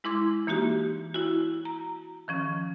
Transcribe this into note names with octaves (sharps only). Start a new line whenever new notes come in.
G#3 E4 C6 D6 G#6
E3 A#3 D#4 F#4 G4
E4 F#4
A#5
D#3 F3 C#4